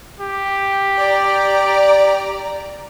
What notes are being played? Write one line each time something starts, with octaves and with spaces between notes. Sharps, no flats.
G4
D5 A#5